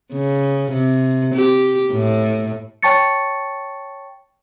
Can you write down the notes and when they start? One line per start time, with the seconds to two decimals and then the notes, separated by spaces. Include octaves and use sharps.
0.13 C#3
0.71 C3
1.34 G4
1.92 A2
2.83 C#5 G5 A5 C#6 A6 C#7